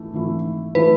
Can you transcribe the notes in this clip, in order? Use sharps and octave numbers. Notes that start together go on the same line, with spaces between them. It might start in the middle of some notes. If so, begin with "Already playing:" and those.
Already playing: G#2 E3 A3
G#2 E3 A3 E4
E3 A3 E4 B4